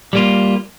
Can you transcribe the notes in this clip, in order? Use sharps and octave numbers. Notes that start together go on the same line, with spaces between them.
G3 A#3 F4